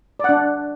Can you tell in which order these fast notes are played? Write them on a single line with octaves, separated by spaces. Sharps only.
D5 F#5 D4